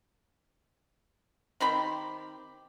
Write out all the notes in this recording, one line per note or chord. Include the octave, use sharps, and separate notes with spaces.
D#3 C4 G4 B5